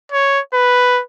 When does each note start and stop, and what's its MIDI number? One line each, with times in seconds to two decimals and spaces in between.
0.12 0.40 73
0.54 1.02 71